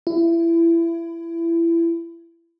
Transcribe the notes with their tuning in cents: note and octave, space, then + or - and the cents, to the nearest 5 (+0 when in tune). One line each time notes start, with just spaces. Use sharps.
E4 +25